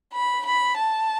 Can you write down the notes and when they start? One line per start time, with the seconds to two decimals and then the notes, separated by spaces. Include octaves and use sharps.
0.14 B5
0.46 B5
0.78 A5